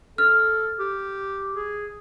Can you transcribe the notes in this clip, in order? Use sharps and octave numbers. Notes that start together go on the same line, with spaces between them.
A4 F6
G4
G#4